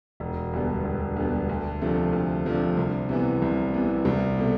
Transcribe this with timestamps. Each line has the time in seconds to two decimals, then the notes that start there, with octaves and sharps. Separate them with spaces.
0.20 E1
0.53 D2 D3 G3 B3
0.85 E1
1.16 D2 D3 G3 B3
1.49 D2
1.81 C3 F3 A3 D4
2.13 D2
2.45 C3 F3 A3 D4
2.77 C2
3.09 C3 E3 B3
3.42 C2
3.74 C3 E3 B3
4.05 C2
4.38 B2 A3